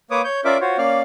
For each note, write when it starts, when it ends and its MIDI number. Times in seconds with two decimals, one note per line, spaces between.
0.11 0.22 58
0.11 0.22 71
0.11 0.22 73
0.11 0.22 86
0.11 0.22 87
0.24 0.41 73
0.24 0.41 91
0.45 0.58 61
0.45 0.58 65
0.45 0.58 70
0.45 0.58 74
0.45 0.58 76
0.45 0.58 86
0.61 0.77 65
0.61 0.77 66
0.61 0.77 72
0.61 0.77 73
0.78 1.02 58
0.78 1.02 61
0.78 1.02 74
0.78 1.02 77
0.78 1.02 89